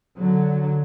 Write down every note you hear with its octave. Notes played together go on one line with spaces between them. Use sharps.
D3 F#3